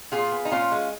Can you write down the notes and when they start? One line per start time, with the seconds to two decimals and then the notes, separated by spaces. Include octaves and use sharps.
0.12 A#2 F4 G#4
0.31 B3
0.45 D#4
0.51 A#2 C#4 F4
0.72 G#3